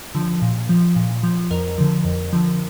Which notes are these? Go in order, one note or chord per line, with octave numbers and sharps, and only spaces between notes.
D3 F3
A#2
F3
A#2
F3
F2 A#4
D3 F3
F2
D3 F3